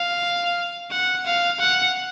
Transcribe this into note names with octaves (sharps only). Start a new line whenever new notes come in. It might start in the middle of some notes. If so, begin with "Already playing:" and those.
Already playing: F5
F#5
F5
F#5